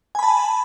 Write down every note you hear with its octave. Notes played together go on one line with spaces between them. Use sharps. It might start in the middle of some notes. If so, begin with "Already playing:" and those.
G#5 A5 B5